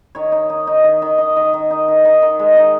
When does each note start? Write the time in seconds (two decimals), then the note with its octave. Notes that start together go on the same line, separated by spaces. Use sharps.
0.15 D#3 C#5
0.32 D#4
0.50 D#4
0.67 D#4
0.84 D#3
1.02 D#3
1.18 D#3 D#5
1.36 D#3
1.53 D#3
1.70 D#4
1.88 D#3
2.05 D#3
2.22 D#3
2.39 G#3
2.57 D#4